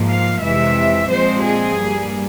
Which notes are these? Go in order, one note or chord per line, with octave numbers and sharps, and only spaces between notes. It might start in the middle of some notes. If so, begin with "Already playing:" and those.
Already playing: G#2 F3 A#3
F5
F2 C3 E3 G#3 E5
A#2 F3 G#3 C4 C5
G#4
G2 G3 A#3